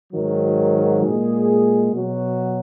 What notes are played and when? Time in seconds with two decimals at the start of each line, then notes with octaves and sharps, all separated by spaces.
0.12 G#2 D#3 F#3
1.02 A#2 G#3 G#4
1.92 B2 F#3 F#4